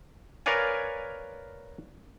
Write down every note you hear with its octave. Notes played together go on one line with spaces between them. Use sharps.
A#4 B4 C#5 D5 F5 G#5